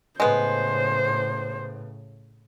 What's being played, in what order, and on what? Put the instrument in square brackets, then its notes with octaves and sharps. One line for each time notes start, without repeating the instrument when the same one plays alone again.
[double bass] A2 C#3 [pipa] G#3 B3 [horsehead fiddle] C5